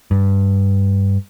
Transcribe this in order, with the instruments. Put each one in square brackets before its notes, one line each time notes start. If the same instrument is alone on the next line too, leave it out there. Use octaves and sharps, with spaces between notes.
[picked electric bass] G2